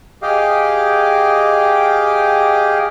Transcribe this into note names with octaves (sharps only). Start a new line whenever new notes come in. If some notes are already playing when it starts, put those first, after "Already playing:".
G4 G#4 D#5 F5 G5 D6